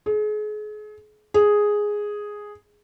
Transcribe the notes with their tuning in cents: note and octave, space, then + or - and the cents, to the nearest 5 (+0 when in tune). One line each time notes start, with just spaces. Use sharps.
G#4 +35
G#4 +0